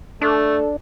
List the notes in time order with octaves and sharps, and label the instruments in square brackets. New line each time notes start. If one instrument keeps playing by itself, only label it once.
[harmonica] A3 [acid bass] D4 [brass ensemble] A4